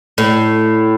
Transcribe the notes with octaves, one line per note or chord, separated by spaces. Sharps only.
A2